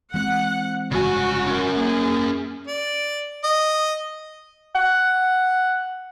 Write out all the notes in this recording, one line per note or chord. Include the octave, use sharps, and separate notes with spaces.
E3 G#3 C4 F#5
F1 G2 C#3 G#3 F#4 G#5
C#4 A#4
A#3 G#4
D5
D#5
F#5